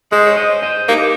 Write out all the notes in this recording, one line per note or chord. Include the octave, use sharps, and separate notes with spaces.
G#3 G#4 C5
C#5
C5 D#5
C5 D#5
A#3 D#4 G4